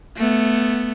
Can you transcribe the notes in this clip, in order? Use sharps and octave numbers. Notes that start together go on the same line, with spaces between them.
A3 B3